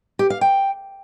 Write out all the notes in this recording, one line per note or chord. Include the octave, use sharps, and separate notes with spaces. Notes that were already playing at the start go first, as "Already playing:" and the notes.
G4
F5
G5